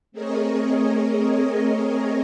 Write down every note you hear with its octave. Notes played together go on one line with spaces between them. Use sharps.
A3 C4 G#4 A#4 C#5 D#5